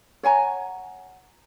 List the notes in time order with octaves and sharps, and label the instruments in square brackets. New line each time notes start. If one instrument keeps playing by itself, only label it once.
[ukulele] C#5 F#5 G#5 A#5